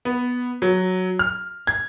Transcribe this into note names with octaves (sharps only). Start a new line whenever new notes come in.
B3
F#3
F6
G#6